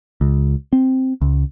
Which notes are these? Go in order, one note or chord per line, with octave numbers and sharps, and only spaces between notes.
C#2
C4
C#2